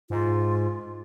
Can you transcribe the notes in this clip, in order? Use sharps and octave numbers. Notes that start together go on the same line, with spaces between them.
G#2 F4